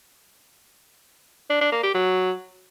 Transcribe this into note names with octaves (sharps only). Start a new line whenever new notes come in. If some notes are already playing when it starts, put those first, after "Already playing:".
D4
D4
A#3
G4
F#3